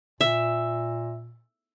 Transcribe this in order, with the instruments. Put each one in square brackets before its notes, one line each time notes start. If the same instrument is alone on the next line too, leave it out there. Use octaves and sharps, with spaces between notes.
[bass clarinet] A#2 [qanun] E5